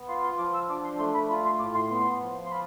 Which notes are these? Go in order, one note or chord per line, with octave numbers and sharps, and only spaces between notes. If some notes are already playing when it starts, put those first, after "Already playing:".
Already playing: B3
F4 C6
C6
F3 D6
E6
D4 D6
C6
A3 C6
B5
F4 B5
C6
A2 D6
C6
B3 C6
F3
C6
F4 B5